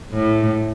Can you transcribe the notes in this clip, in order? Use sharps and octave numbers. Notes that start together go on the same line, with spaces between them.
A2